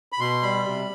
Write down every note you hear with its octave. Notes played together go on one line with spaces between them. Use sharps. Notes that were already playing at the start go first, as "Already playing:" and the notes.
B5
B2 C6
G3 B5
C3